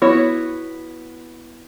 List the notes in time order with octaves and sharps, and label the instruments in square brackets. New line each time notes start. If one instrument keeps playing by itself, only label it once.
[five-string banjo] B3 E4 F#4 C#5